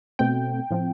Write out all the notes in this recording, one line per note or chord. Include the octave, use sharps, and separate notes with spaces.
B2 A3 C4 G5
A2 F3 C4